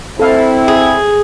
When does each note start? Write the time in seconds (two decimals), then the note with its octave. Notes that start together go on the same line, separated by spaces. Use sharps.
0.19 C4 E4 A4 F5
0.68 G#4